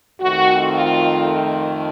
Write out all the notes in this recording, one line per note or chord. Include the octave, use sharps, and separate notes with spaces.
F2 D#3 A3 C4 F#4
F4